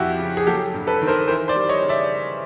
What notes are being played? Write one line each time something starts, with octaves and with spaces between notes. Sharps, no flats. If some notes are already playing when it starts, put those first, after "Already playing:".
Already playing: F2 F3 E4 F#4 G4
C#3
G#4
F#3 G4 A4
G2
A4 B4
D#3
A#4 C5
E3 A#4 C5
C5 D5
G3
C#5 D#5
C#3
D5 E5